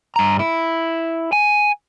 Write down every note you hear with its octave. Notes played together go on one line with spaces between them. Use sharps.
G2 A#5
E4
G#5